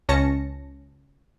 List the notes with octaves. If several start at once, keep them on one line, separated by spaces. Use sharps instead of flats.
C#2 C#4 A5 A#6 C#7